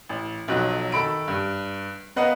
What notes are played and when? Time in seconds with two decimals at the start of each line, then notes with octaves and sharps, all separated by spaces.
0.09 A1
0.48 B1 F2 F#3 F#6
0.92 D#3 A4 B5 D7
1.28 G2
2.16 B3 A#4 B4 D#5 F5 F#5